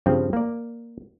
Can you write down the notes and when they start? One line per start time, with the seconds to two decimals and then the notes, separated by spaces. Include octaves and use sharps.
0.06 G2 C#3 F3 C4
0.33 A#3 D5